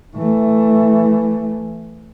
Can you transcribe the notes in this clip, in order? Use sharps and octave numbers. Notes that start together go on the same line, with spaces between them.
E3 A3